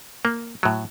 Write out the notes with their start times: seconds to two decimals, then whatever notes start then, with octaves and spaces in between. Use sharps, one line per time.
0.25 A#3
0.63 A2 F#3